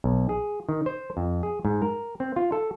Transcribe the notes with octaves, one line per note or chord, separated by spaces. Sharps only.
B1
G#4
D#3
C5
F2
G#4
G#2
A#4
C4
F4
A4